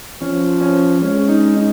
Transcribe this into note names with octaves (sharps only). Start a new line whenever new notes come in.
F3 C#4
C#4
G#3 C#4
D#4
D#4